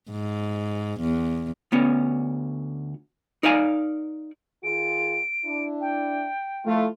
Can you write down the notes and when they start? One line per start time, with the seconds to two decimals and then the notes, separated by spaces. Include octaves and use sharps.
0.11 G#2
1.01 E2
1.72 D2 B3 C#4
3.43 D#4 A#4 D5 F5 G#5
4.64 D#3 F4 G#4 D7
5.44 D4 E4
5.81 G5
6.65 F3 A3 E4 F4